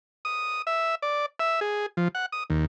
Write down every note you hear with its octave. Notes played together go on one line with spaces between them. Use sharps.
D#6
E5
D5
E5
G#4
F3
F#5
D#6
D#2